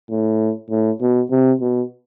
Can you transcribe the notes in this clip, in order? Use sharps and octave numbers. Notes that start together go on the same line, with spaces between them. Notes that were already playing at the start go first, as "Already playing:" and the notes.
A2
A2
B2
C3
B2